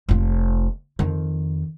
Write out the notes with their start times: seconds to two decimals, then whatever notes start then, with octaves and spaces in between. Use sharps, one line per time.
0.09 F1 F4
0.99 F2 D#3